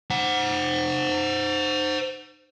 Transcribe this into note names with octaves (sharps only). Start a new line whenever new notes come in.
C5 F#5